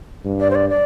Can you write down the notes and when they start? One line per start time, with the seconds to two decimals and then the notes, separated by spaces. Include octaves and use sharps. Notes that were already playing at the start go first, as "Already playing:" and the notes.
0.25 G2
0.40 D5
0.50 C5
0.55 D5
0.69 D5